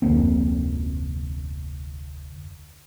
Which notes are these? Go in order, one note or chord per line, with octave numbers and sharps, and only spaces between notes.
F1 D2 A#3 C4